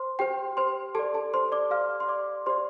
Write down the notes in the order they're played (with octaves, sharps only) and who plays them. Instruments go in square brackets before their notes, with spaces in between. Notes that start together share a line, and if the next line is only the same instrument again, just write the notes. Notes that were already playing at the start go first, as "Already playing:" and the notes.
Already playing: [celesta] C5 C6
G4 C5 G5
C5 C6
G4 A4 D5 A5
A4 A5
C5 C6
D5 D6
G4 D5 F5 F6
C6
D5 D6
G4 C5 D5 C6